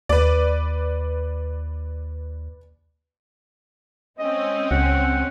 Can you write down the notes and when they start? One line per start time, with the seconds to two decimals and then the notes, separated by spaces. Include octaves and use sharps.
0.09 D#2 B4 D5
4.19 G#3 C4 C#4 D#5
4.71 C#2 F#5